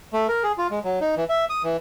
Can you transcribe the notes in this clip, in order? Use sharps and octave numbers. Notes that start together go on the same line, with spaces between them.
A3
A#4
G#4
F4
G#3
F#3
D#4
E3
E5
D#6
E3